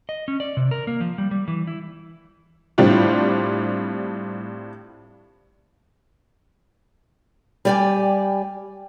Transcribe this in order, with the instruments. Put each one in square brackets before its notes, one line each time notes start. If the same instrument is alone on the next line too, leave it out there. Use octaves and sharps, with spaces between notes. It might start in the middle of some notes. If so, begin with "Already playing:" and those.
[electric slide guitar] D#5
C#4
D5
C3
A#4
A#3
F3
G3
G3
E3
E4
[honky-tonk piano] A2 G3 C4 D4 F4
[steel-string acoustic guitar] G3 G4 D5 F5 G5 G#5